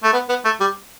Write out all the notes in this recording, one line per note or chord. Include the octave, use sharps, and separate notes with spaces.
A3
B3
B3
A3
G3